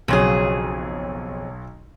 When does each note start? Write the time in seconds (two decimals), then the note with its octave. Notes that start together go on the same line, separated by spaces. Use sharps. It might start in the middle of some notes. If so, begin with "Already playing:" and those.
0.08 B1 F2 C#3 F#3 G#4